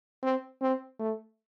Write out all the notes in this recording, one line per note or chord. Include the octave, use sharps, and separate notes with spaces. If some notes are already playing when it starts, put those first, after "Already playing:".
C4
C4
A3